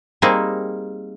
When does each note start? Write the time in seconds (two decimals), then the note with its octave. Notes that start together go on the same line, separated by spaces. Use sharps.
0.22 G3 A#3 C4 D#4 G#4